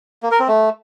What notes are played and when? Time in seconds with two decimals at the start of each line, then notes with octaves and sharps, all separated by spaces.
0.23 A#3
0.31 A#4
0.40 C4
0.48 A3